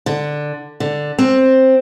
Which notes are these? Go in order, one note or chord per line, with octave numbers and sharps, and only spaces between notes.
D3
D3
C4